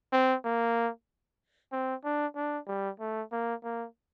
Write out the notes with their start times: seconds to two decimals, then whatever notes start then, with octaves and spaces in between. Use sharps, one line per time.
0.13 C4
0.45 A#3
1.72 C4
2.04 D4
2.36 D4
2.67 G3
3.00 A3
3.32 A#3
3.64 A#3